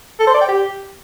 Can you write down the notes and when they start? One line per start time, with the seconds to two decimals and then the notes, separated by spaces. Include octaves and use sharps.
0.20 A4
0.27 C5
0.34 D5
0.41 G5
0.48 G4